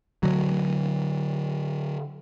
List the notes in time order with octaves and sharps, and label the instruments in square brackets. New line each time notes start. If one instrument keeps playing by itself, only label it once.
[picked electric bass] D3 F#3